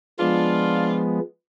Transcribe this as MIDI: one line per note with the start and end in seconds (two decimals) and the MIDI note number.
0.20 1.20 53
0.20 1.20 56
0.20 1.20 59
0.20 1.02 62
0.20 1.02 65